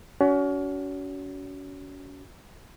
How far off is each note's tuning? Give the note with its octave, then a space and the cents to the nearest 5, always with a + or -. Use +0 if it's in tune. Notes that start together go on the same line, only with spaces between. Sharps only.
C#4 +40 F#4 +20